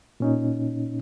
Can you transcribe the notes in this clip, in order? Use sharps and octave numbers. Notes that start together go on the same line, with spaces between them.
A#2 C#4 D#4